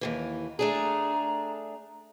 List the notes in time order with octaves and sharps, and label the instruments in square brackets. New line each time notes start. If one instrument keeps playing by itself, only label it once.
[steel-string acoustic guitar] D#2 G#2 E3
[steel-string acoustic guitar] A3 D4 G#4 [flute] A#5